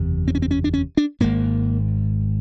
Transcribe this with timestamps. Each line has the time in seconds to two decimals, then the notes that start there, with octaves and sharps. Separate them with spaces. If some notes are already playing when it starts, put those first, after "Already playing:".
Already playing: F#1 E2 C3
0.28 C4
0.35 C#4
0.42 C4
0.51 C#4
0.64 D4
0.74 C#4
0.97 D4
1.20 G#1 G#2 A#3